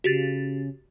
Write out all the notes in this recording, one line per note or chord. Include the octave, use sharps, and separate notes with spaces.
C#3 F#4 G4 A6